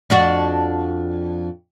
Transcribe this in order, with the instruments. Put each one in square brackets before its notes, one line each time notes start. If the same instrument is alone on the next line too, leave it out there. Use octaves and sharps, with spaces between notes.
[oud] F2 D4 F#4